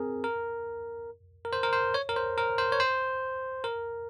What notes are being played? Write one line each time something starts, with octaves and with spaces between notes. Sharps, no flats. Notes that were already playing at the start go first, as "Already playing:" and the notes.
Already playing: C4 G#4 A#4
A#4
A#4
C5
A#4
C5
C#5
A#4
C5
A#4
C5
C#5
C5
A#4